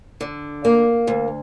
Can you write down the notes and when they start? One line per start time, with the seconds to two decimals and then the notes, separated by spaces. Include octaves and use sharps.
0.21 D3
0.65 A#3
1.07 D2